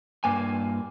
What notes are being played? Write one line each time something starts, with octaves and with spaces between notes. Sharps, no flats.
G2 A#3 G#5